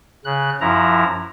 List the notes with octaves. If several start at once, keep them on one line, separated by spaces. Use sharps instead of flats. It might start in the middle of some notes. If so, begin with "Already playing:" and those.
C#3 F#6
F#2 F3 E4 A#5